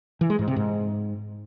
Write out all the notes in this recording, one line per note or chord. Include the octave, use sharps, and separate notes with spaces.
E3
G#3
G#2
C3
G#2